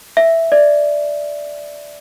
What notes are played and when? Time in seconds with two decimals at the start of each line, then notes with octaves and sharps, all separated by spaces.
0.17 E5
0.52 D5